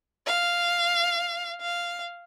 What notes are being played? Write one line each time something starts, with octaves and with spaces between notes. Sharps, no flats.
F5
F5